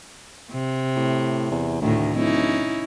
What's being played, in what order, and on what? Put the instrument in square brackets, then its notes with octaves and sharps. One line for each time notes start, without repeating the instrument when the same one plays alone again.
[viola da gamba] C3
[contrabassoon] A2
E2
[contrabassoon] D2 [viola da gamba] A2 D#3
[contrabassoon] D1 [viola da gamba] C#4 D#4 E4